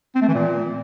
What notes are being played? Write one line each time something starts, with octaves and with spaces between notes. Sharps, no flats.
C4
A3
E3
A#2